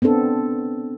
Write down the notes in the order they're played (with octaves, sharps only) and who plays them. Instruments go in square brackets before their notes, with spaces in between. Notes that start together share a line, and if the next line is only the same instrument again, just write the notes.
[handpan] B3 C4 D4 A4